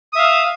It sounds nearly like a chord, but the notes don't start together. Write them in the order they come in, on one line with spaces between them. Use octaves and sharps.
D#6 E5 F5